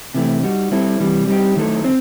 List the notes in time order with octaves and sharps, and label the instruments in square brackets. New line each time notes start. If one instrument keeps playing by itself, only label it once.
[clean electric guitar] C3 E3 A3 C4
G3 D#4 F#4
G3 C4 E4 A4
C3 E3 G3
G3 C4 D#4 G4
D#3 F#3 A3 E4 A4
C4